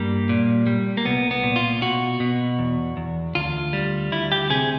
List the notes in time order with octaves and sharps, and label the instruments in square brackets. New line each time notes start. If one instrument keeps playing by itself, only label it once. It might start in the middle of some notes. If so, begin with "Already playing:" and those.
Already playing: [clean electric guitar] G2 G3 A#3
A#2
G3
A#3
C2 B3
B3
A#2
F4
B2 F#4
B2
E2
E2
D2 F4
G3
D2 E4
G4
C3 G#4